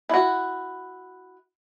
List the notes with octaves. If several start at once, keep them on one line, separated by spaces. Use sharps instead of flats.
E4 F#4